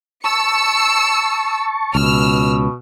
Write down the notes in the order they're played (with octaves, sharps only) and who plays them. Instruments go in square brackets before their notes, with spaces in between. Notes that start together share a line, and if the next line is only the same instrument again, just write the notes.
[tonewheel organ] A5 C#6 [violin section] E6 C#7
[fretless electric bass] C#2 [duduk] B2 [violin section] E6 F6